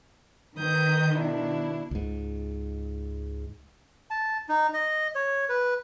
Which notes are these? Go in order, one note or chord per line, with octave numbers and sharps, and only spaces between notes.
D#3 B4 D#6 G6
B2 D4 E4
C#2 G#2
A5
D#4
D#5
C#5
B4